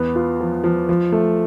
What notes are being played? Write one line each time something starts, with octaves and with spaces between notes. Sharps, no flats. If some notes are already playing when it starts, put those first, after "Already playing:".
Already playing: E2 B3
F4
F3
F3
F3
A3